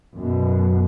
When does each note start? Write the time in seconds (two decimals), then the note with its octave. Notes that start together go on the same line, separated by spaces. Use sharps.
0.15 F#2 B2